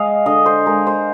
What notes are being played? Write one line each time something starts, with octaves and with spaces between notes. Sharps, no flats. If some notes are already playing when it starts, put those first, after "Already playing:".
Already playing: G#3 D#5 F5
D3 D#5
C5
G#3 A#4
C5